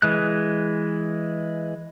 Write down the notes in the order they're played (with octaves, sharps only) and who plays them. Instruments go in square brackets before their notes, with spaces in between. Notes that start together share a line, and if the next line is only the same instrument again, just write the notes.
[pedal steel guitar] E3 G#3 F#6